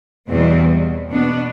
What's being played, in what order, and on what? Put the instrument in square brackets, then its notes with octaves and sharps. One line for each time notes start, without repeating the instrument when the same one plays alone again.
[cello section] E2 B2 G3 C4
B2 B3 D4